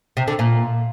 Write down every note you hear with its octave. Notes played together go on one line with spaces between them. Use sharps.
C3
D3
A#2